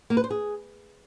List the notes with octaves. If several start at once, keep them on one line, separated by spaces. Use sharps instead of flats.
A#3
B4
C5
G#4